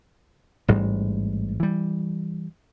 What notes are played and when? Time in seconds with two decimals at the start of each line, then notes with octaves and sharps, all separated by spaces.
0.68 A1 G#2 G3
1.60 E3 G3